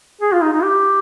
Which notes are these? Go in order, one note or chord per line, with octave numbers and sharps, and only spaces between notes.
G#4
F4
D#4
D#4
G4